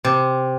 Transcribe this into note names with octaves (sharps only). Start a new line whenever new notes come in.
C3